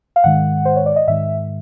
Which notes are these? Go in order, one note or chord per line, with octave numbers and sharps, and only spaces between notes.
F5
G#2 D#3 G#3 F#5
C5
C#5
D5
D#5
G#2 D#3 G#3 E5